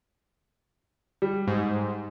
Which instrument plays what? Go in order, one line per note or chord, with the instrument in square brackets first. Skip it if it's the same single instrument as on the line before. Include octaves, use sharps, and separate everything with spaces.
[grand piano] G3
[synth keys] G#2